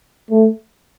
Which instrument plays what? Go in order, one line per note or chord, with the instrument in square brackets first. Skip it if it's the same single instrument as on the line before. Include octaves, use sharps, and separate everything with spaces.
[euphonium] A3